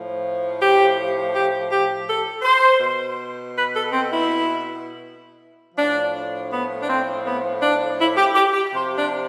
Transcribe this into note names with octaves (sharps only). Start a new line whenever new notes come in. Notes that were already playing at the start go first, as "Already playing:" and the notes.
Already playing: A2 F3
G4
G4
G4
A4
C5
B2
B4
A4
C4
E4
A2 F3 D4
B3
D4
C4
B3
D4
E4
G4
G4
G4
C3 F3 C5
D4